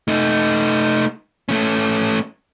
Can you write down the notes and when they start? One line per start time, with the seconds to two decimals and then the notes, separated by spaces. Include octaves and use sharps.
0.08 A3 D#4
1.49 A3 C#4